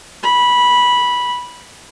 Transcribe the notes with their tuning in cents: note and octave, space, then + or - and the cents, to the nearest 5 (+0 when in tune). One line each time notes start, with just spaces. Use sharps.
B5 -15